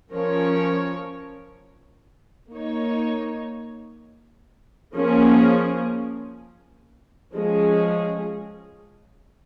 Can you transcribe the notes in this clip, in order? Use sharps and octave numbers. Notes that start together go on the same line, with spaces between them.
F3 C#4 A#4 C#5
A#3 D#4 C#5
F3 A#3 C#4 G#4
F3 G#3 C#4 G#4